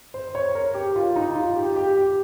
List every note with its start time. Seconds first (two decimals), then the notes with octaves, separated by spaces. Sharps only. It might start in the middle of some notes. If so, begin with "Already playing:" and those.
0.14 C5
0.35 C#5
0.55 A#4
0.74 G4
0.96 F4
1.16 D#4
1.35 F4
1.56 G4
1.76 G4
1.97 G4